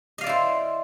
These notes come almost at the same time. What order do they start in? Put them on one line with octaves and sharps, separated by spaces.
D#5 F5 D5 E4 C5